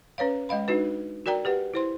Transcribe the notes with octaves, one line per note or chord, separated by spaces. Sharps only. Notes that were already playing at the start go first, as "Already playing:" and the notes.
C#4 B4 C#5 F5
G#3 D#5 F5 B5
D4 D#4 F#4 B4
F#4 A#4 D5 G5 A#5
G4 B4 F#5
E4 C5 C6